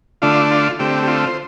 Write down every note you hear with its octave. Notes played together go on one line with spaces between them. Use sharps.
D3 A3 D4 F4
F4
D3 A3 C4 G4
G4
F4
C5